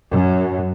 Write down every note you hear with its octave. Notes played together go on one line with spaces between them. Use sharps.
F#2